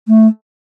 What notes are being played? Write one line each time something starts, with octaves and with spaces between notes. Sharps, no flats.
A3